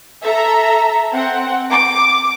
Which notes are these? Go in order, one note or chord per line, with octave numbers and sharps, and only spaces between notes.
A4 E5 A#5
C4 F#5
D6